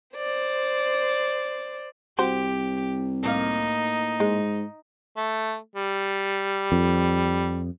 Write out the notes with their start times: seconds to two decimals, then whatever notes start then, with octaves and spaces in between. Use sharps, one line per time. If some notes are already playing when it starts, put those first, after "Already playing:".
0.16 C5 D5
2.19 C2 F#4 G4 C5
3.23 A2 A#3 D#4 F5
4.20 G#2 G#3
5.17 A3
5.76 G3
6.72 F2